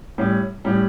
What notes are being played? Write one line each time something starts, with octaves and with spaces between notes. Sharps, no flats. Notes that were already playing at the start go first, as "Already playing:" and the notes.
A2 G3 C#4
A2 G3 C#4